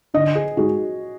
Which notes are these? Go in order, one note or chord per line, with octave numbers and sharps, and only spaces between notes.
D3 D#5
G#4
G#3 D#4 F#4 G#4